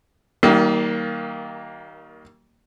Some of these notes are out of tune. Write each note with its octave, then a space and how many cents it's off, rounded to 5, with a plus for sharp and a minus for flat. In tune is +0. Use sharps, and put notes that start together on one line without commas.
D#3 +20 G3 -35 A#3 +0